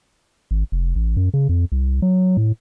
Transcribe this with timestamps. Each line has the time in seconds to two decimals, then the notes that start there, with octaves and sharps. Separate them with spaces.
0.51 G#1
0.72 F1
0.96 A1
1.17 F#2
1.34 C#3
1.49 F2
1.72 C2
2.02 F#3
2.37 A2